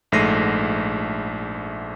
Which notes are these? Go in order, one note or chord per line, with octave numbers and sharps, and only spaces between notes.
A#1 G#2 A3 A#6 C7 D#7